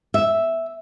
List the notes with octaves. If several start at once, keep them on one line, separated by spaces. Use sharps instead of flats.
E5